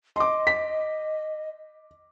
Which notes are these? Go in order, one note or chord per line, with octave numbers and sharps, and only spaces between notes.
D#5 C6 D6
B6